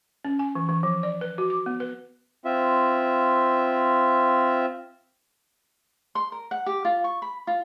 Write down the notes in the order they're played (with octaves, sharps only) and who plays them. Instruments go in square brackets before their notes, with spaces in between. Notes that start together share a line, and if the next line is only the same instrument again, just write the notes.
[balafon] C#4
G#5
E3
E3
F3
D5
B4
F#4
D6
B3
B4
[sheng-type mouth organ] C4 F4 E5
[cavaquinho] C6
A#4
F#5
G4
F4
C#6
B5
F4